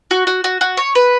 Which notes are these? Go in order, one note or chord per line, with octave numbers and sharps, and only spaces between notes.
F#4
F#4
F#4
F#4
C#5
B4